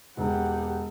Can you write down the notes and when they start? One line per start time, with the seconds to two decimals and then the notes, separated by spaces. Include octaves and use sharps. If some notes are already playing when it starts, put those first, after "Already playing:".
0.17 E1 G4 F#5